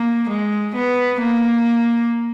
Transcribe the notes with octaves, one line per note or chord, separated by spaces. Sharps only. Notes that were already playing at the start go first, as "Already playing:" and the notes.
Already playing: A#3
G#3
B3
A#3